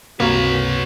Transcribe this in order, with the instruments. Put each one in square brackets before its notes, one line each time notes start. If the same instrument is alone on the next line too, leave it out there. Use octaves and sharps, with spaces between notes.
[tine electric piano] C#2 G2 C3 [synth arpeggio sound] A#3 [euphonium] F#4 [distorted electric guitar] B4 C#5